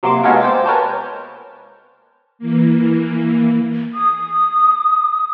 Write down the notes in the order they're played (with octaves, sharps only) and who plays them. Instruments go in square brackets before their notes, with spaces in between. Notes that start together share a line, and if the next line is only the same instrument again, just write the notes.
[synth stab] C3 F#3 A#3 C6 D6 E7
G#3 B3 C#4 F4 A4 A#4
C5 G5 D6 A6
A#4 B4 C#5 G#5 A5 G6
[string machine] E3 A#3
[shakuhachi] D#6